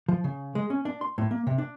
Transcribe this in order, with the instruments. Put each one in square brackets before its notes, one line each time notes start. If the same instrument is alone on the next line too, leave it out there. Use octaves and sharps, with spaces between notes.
[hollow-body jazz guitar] F3
C#3
G#3
C#4
D4
C6
A2
A#3
C3
D4